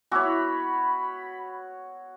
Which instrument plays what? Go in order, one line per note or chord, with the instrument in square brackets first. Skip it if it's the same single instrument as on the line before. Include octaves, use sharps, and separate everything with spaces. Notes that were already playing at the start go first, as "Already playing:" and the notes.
[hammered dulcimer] B3 E4 [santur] F#4 C#5 [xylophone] G#5 D6 E6 [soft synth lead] B5